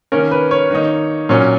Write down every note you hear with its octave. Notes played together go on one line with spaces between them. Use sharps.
D#3 A#3 C#4 A#4
B4
C#5
D#3 A#3 D#4
A#2 F#3 C#4